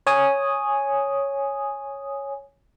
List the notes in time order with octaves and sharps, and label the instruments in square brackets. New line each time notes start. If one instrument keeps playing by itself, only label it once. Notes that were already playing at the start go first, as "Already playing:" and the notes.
[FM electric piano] C#5 G#5 D#6